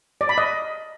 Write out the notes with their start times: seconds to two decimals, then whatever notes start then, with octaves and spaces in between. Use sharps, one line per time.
0.21 D5
0.29 B5
0.38 D#5